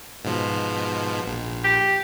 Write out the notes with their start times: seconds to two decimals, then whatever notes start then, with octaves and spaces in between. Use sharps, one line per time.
0.25 G#2 B2 F3
1.26 A#1
1.64 G4